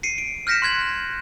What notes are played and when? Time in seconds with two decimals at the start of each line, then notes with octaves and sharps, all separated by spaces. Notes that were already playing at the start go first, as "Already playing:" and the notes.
0.03 C7 C#7 D#7
0.18 D7
0.47 F6 G6 A#6 B6 C#7 E7
0.62 C6 F#6 G#6 F#7